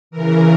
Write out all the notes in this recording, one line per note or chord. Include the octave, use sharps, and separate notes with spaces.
C#3 E3 A#4